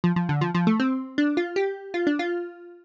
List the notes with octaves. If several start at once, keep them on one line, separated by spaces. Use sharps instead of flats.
F3
F3
D3
F3
F3
A3
C4
D4
F4
G4
F4
D4
F4